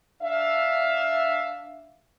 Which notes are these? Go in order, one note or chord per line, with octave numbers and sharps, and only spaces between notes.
D4 E5 F5